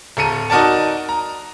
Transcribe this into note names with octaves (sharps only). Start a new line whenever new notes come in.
D1 A4 A#5 C#7 D#7
D#4 F#4 A#4 D5 A5
A#5